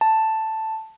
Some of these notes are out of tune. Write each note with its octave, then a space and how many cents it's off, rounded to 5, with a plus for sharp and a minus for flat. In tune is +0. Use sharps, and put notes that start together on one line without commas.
A5 +5